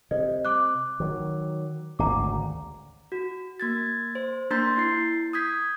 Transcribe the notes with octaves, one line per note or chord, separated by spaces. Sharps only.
C3 D#5
D6 F#6
D#3 F#3
G#1 D2 C#3 A#5 D6
F#4
A#3 G#6 A6
C5
A#3 D4 A#5 C6 G6 A6
E4 A6 C7
D#6 G6 G#6 B6